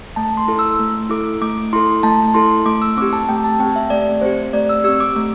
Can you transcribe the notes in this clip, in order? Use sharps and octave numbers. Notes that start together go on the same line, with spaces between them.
A3 A5
C6
E4 A4
E6
A3
E4 A4 D6
A3 D6
E4 A4 C6
A3 A5
E4 A4 C6
A3 D6
E6
C4 G4 D6
A5
A3 G5
A5
C4 G4 G5
E5
A3 D5
C4 G4 C5
A3 D5
E6
C4 G4 E6
D6
A3